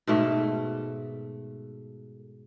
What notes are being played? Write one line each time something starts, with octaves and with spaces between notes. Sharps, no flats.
G#2 B2 A3